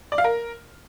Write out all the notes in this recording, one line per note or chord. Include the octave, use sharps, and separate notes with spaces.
D5
F5
A#4